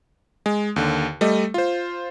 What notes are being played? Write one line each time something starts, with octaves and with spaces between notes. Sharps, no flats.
G#3
D#2 D3
G3 A3 D#5
F4 C5